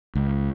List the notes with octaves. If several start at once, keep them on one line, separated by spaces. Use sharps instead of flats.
C#2